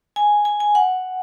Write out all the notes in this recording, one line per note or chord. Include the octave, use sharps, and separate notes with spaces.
G#5
G#5
G#5
F#5